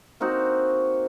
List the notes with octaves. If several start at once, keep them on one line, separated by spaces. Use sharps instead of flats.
A#3 C4 D#4 F#4